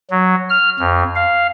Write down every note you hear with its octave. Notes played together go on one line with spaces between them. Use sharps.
F#3
F6
F2
F5